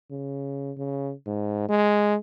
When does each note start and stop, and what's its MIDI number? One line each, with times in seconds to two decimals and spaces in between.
0.11 0.72 49
0.78 1.12 49
1.26 1.65 44
1.69 2.15 56